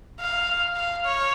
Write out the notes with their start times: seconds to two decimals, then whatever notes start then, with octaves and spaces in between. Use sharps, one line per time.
0.20 F5
0.76 F5
1.04 C#5